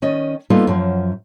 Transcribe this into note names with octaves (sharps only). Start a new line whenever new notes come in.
D#3 C#4 D5 D#5
G3 A#3 B3 D#4 F4 A4
F#2 F3 F#3